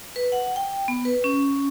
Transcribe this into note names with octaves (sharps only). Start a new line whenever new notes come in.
B4
F#5
G5
B3
B4
C#4